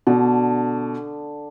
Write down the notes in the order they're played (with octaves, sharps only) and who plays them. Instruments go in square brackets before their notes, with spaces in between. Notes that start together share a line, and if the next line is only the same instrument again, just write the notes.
[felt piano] B2 [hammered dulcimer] D3